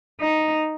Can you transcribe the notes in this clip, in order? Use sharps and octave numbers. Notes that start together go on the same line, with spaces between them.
D#4